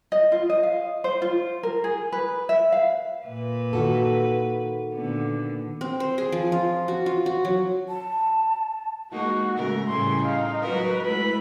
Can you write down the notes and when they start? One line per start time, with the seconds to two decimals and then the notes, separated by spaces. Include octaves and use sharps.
0.12 D#5
0.32 F4
0.50 D#5
0.63 F5
1.04 C5
1.22 F4
1.63 A#4
1.84 G#4
2.12 B4
2.49 E5
2.72 F5
3.26 A#2 B4
3.73 D#3 F#4 A4
4.93 A#2 D3 B3
5.81 C4
6.00 C5
6.18 G#4
6.32 F3
6.52 F4
6.88 F#4
7.06 F4
7.26 F#4
7.45 F#3
7.89 A5
9.12 G#3 A#3 D#4 F#4
9.54 G#2 C#3 A3 A#4
9.88 A2 C#3 G3 C6
10.24 D#4 F5
10.62 F#3 F#4 A#4 B4
11.06 G#3 A3 E4 B5